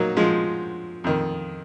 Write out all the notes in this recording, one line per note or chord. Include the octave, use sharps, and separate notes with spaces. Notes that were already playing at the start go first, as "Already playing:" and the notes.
Already playing: F#3 A#3 D#4 F#4
F3 G#3
F2 D#3